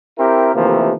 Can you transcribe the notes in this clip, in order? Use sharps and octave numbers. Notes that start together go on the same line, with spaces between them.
C4 E4 G4 A#4
D#2 C3 E3 F3 A3 A#3